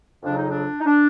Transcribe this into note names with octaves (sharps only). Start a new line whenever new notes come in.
F2 C#3 F#3 D4
D#4
D4
D#4
D4